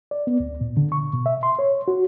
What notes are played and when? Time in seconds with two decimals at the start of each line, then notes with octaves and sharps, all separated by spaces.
0.11 D5
0.27 B3
0.40 D2
0.61 A#2
0.77 D3
0.92 C#6
1.13 B2
1.26 E5
1.43 C6
1.59 C#5
1.88 F#4